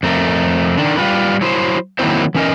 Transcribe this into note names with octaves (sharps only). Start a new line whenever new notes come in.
F2 A3 A#4
D3 D#3 D4
G3 F4 B4
F#3 E4 C5
D#3 F#3 A#3 C4 E4 C5
E3 C#4 A#4 D#5